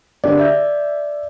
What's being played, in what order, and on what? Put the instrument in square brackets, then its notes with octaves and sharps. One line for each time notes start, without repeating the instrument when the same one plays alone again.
[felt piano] D3 G4 A#4 [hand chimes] D5
[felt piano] E5 G6